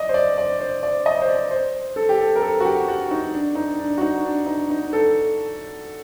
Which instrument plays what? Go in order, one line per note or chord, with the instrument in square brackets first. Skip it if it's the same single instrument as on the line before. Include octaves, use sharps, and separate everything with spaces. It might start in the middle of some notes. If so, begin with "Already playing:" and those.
Already playing: [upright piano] D5 D#5
C5
D5
D5
C5
D5
D#5
C5
D5
C5
A4
G4
A4
A#4
A4
F#4
G4
F#4
D#4
D4
D#4
D4
F#4
D#4
D4
D#4
D#4
A4